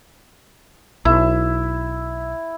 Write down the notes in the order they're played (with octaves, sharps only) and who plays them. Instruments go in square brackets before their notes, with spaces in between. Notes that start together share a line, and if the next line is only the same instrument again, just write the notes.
[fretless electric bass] B1 [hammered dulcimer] E4